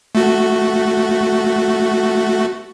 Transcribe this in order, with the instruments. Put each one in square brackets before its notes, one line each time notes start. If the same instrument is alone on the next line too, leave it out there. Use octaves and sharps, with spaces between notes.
[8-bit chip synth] A3 F#4